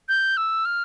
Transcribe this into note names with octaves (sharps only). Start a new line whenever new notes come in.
G6
E6
F6